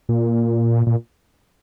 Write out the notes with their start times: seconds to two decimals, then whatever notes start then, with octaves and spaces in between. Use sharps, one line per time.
0.09 A#2
0.87 A#2